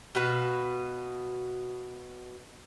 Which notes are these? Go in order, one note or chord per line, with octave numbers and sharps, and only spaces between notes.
B2 F#4 B4 F5